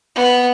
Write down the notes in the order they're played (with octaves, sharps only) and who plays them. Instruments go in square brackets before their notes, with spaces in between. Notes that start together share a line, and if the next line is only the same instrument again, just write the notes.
[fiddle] B3